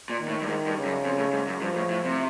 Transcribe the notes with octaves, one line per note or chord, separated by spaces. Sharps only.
A#2
D#3
A2
G2
G#2 D#3
G2
C#3
F#2
F2
A2
G#2
F#2
G2 F3
A2
A2
C3